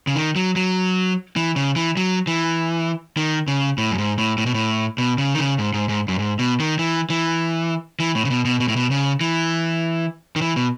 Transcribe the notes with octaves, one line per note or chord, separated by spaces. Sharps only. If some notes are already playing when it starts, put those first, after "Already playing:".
C#3
D#3
F#3
F#3
E3
C#3
E3
F#3
E3
D#3
C#3
A2
F#2
G#2
A2
A2
B2
A2
B2
C#3
D#3
C#3
G#2
G#2
G#2
F#2
G#2
B2
D#3
E3
E3
E3
A2
C#3
B2
B2
B2
A2
B2
C#3
E3
D#3
E3
B2